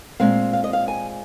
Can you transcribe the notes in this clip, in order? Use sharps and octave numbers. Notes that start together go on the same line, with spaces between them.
A#2 G#3 C4 F5
F5
D#5
F5
G#5